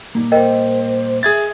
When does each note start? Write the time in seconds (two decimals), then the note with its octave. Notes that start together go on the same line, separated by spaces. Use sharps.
0.15 A#2 G3 A#3 D#4
0.32 A#4 C5 D#5 G5
1.23 G#4 E5 G#6 A6